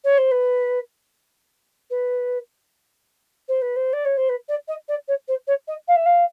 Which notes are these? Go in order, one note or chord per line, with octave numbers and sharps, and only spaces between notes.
C#5
C5
B4
B4
C5
B4
C5
D5
C#5
C5
B4
D5
D#5
D5
C#5
C5
C#5
D#5
F5
E5
F5